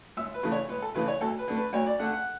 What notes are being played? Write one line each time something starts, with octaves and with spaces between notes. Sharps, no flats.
C#2 E5
B4
C#3 E3 A3
C#5
C#2 B4
A4
C#3 E3 A3 B4
C#5
D2 A4
B4
D3 A3
B4
D2 C#5
D5
D3 A3 F#5
F#5